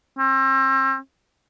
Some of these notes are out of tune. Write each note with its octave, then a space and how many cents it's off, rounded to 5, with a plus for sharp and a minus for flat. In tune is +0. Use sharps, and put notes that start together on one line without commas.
C4 +40